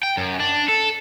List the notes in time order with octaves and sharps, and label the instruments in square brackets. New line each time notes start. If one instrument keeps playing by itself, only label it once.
[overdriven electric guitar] G5
F#2
D4
A4